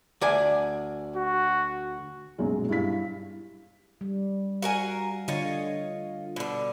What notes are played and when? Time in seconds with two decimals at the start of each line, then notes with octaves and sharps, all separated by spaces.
0.21 D2 D5 G#5
1.16 F#4
2.38 B1 F#2 A#2 F#3 G#3
2.69 G2 E4 F5 B6
4.01 G3
4.62 F#4 A#4 F5 G#5
5.28 D3 F4 C#5 D#5
6.36 B2 D3